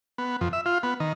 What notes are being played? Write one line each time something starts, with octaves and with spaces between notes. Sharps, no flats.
B3
F2
E5
F4
B3
D#3